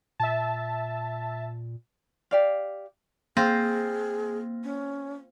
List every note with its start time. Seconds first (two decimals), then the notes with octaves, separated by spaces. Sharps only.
0.20 A#2 E5 A5
2.31 G4 D5 F5
3.37 A#3 C4 F4 G#4
4.64 C#4